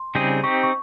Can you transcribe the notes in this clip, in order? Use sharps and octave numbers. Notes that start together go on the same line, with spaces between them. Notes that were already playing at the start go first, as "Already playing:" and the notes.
Already playing: C6
C#3 G3 C4 D#4 G#4
C4 D#4 G4 C#6
C#6